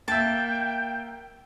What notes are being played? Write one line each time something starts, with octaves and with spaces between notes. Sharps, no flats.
A#3 E5 G5 A5